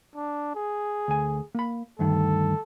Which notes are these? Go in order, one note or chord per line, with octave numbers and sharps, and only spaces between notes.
D4
G#4
D2 G#5
A#3 B5
D2 G2 D#3 A4